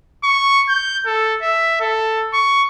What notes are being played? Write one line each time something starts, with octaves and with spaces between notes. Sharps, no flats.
C#6
G6
A4
E5
A4
C#6